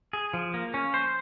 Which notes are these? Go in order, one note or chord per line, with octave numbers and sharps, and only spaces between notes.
G#4
F3
A#3
C#4
C5